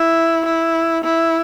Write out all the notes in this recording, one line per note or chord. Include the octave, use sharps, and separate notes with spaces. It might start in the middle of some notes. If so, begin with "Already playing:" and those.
Already playing: E4
E4
E4